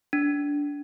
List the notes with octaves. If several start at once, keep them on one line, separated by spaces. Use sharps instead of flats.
D4